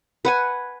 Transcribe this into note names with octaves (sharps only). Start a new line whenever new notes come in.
B4 F#5 G#5